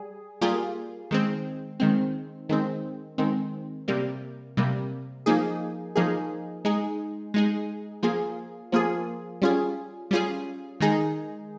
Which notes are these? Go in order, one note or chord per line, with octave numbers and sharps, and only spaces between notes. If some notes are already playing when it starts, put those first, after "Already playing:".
Already playing: G3 G#4
G3 A#3 F4 G#4
D#3 G#3 C4
D#3 G#3 C4
D#3 G#3 C4
D#3 G#3 C4
C3 G3 A#3
C3 G3 A#3
F3 A#3 D#4 G#4
F3 A#3 D#4 G#4
G#3 D#4 G#4
G#3 D#4 G#4
F3 A#3 F4 G#4
F3 A#3 F4 G#4
G3 C#4 F4 G#4
G3 C#4 F4 G#4
D#3 G#3 D#4 G#4